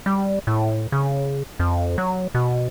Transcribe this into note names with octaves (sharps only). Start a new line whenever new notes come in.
G3
A2
C#3
F2
F#3
B2